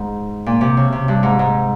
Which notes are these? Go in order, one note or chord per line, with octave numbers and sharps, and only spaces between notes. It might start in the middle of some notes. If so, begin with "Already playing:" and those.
Already playing: G#2
A#2
C3
C#3
C3
G2
G#2
G#2